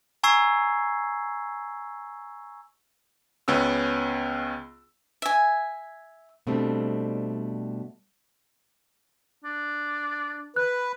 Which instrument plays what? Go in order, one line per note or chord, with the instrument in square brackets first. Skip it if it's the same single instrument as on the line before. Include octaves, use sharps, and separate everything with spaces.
[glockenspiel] G#5 A#5 C#6 E6 G#6 C7
[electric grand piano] C#2 B3 C#4 E6
[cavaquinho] E5 G#5
[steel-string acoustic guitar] B2 G3 A3 C4 D4
[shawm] D4
[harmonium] B4 [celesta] F#6